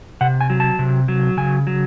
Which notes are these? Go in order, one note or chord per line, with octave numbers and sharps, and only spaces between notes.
C3 F#5
G#5
F#3
A5
C3
F#3
C#3 G#5
F#3